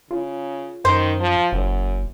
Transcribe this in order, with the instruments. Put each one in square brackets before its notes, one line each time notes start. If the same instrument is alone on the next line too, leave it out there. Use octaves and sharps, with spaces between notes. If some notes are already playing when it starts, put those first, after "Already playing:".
[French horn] C#3 [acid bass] F4
[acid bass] F#2 [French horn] D#3 [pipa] C5
[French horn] F3
[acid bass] F#1 [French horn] F#2